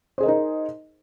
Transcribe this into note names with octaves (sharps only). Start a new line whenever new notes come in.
D#4 G#4 A#4 C5 D#5